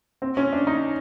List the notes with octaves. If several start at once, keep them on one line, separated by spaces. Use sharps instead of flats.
C4
C#4
D4
D#4